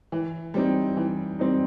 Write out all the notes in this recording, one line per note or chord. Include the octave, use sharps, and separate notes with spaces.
E3
G3 C4 D#4
E3
G3 C4 D#4